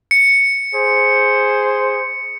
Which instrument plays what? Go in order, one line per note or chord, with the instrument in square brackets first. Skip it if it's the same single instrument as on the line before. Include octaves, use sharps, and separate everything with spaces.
[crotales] C#7
[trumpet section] G#4 C5